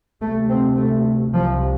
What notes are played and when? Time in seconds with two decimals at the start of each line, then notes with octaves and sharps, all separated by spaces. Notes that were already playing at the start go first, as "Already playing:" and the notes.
0.21 D2 C3 A3
0.49 C4
0.77 A3
1.33 C2 C3 F3